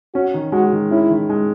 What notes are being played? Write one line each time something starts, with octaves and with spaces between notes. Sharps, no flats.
C#4 F#4
D#3
G#3 F#4
D#3
C#4 E4
D#3
G#3